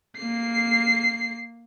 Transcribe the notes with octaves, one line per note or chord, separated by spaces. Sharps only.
A#3 C7